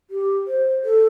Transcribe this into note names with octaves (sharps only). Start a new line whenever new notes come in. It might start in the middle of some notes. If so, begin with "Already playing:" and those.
G4
C5
A4